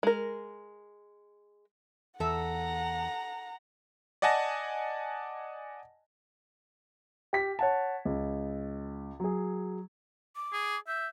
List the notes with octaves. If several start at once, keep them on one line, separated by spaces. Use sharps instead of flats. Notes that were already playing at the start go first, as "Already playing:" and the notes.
G#3 A#4
E2 A4 E5 F#5 A#5
D5 D#5 F#5 G#5 A5 A#6
G4 B6
C#5 F#5 A5
C#2
F#3 G#4
D6
G#4
E5 G6